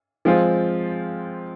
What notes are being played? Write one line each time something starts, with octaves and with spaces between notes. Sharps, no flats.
F3 G#3 C4 F4